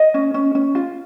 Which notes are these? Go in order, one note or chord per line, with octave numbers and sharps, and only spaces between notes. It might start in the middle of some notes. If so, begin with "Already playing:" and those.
Already playing: D#5
C#4
C#4
C#4
F4